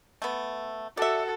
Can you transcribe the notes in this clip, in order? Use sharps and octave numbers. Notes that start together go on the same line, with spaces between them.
A3 B3
F#4 A4 D5 E5